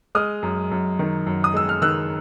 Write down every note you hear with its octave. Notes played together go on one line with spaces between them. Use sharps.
G#3 D#6 F6
F#2
F#2
D#3
F#2
D#6
G#3 E6
F6
D#3 E6 F#6